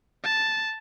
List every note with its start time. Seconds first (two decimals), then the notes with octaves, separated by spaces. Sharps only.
0.24 A5